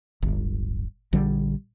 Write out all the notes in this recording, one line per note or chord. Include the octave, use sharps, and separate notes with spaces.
D1 G1
A#1 D3 G3